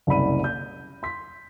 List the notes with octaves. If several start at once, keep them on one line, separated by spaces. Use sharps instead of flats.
F#1 C2 D5 B5 D#7
G6
C6 B6